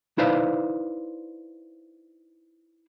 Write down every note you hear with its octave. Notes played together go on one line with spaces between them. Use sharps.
D#4 E4 B4 C5 D5 F5